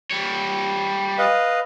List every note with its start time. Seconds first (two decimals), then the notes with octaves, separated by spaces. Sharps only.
0.11 G3 C#5
1.18 B4 D#5 F5